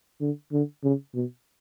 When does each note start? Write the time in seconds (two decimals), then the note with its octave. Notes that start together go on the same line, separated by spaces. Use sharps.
0.21 D3
0.52 D3
0.83 C#3
1.14 B2